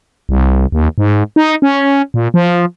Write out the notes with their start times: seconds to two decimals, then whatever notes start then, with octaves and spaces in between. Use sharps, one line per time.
0.29 C2
0.72 D#2
0.98 G#2
1.36 D#4
1.62 C#4
2.14 A#2
2.34 F3